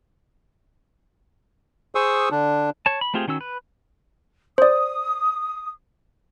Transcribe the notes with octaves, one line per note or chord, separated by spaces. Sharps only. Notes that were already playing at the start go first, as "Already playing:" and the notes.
G#4 C5 C#6 D#6 E6
D3 D4
C#5 A5
B5
A3 C4 F4 G4 G#4
D#3 C#4 F#4 E6
B4
C5 D5 D#6